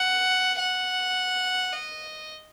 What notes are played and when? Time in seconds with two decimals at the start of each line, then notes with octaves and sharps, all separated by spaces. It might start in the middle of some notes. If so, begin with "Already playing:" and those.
Already playing: F#5
0.58 F#5
1.73 D#5